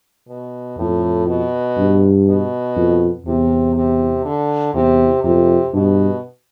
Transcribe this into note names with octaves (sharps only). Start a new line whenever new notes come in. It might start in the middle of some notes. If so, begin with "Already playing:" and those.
B2
F2 A2
B2
G2
B2
F2
E2 C3
C3
D3
E2 C3
F2 C3
G2 B2